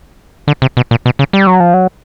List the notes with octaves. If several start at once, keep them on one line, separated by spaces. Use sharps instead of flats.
D3
C3
B2
A#2
B2
C#3
G3
F#3
F3
F#3